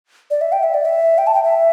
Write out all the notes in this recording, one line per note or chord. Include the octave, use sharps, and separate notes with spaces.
D5
E5
G5
E5
D5
E5
G5
A5
G5
E5